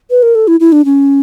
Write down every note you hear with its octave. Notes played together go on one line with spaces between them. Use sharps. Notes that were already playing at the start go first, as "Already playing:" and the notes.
B4
A#4
A4
E4
E4
D4
C#4